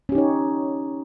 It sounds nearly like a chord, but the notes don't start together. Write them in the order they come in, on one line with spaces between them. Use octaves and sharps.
C#4 G4 D#4 C#5